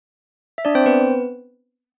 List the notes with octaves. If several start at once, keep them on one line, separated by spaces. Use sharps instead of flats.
E5
D4 D5
C4 C5
B3 B4